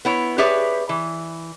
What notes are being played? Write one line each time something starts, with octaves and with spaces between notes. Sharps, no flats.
B3 E4 C#5
G4 G#4 B4 C#5 D5 E5
E3